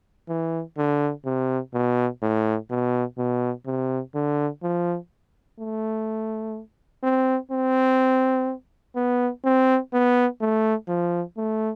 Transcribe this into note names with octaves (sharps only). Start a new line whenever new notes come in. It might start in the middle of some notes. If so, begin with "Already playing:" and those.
E3
D3
C3
B2
A2
B2
B2
C3
D3
F3
A3
C4
C4
B3
C4
B3
A3
F3
A3